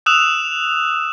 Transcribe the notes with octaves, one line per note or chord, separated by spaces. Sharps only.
D#6 E6 F#6 E7 F7